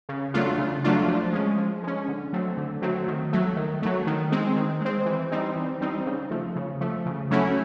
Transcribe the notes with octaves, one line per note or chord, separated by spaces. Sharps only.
C#3
F#3 A3 D4 F4
C#3
F#3 A3 D4 F4
F3
G#3 C#4
F3
G#3 C#4
D3
F#3 A3 C4
D3
F#3 A3 C4
D#3
F#3 A3
D#3
F#3 A3
D#3
G#3 C4
D#3
G#3 C4
E3
G3 C4 D#4
E3
G3 C4 D#4
C#3
F3 A3
C#3
F3 A3
C#3
F#3 A3 C#4 E4